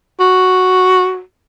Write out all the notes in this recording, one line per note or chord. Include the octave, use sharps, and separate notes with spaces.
F#4